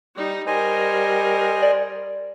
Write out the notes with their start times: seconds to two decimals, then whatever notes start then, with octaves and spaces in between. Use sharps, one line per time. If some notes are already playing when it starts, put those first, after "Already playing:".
0.16 G3 D#4
0.47 G3 A#4 C5 D#5 G#5
1.62 D5